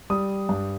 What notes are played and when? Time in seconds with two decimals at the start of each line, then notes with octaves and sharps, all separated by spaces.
0.10 G3 D#6
0.49 G2